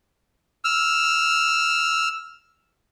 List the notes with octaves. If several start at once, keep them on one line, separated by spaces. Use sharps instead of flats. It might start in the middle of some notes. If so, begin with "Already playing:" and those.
E6 F6